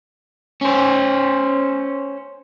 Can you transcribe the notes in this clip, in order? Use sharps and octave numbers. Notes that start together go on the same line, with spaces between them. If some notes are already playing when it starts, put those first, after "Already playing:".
C#4 C5